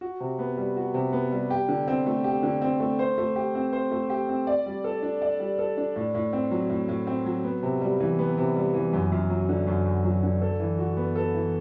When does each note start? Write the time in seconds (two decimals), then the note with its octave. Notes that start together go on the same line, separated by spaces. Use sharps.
0.01 F#4
0.20 C3
0.39 B3
0.57 G3
0.76 F#4
0.94 C3
1.13 B3
1.32 G3
1.50 G4
1.69 D3
1.88 C4
2.06 A3
2.24 G4
2.43 D3
2.62 C4
2.80 A3
2.99 C5
3.18 A3
3.36 G4
3.55 C4
3.73 C5
3.92 A3
4.10 G4
4.29 C4
4.47 D5
4.66 G3
4.84 A4
5.03 D4
5.22 D5
5.40 G3
5.59 A4
5.77 D4
5.96 A2
6.14 A2
6.33 C4
6.51 F#3
6.70 A2
6.88 A2
7.07 C4
7.26 F#3
7.44 B3
7.63 C3
7.81 G3
8.00 E3
8.19 B3
8.38 C3
8.56 G3
8.74 E3
8.93 F#2
9.12 F#2
9.30 F#3
9.49 D3
9.67 F#2
9.86 F#2
10.04 F#3
10.23 D3
10.42 A4
10.60 E3
10.79 F#4
10.97 B3
11.16 A4
11.34 E3